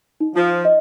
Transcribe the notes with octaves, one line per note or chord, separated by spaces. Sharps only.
D#4
F3
D#5